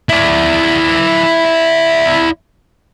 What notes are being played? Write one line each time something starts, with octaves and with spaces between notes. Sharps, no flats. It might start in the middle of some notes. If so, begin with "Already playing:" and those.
E4 D5